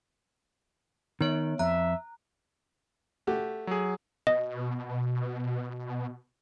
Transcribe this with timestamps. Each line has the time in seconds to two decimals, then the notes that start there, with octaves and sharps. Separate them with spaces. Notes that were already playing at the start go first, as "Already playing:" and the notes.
1.21 D#3 B3 C#5 D7
1.59 F2 E5 A#5 F#6
3.27 A3 F#4 G4
3.67 F#3 G#4
4.27 B2 D#5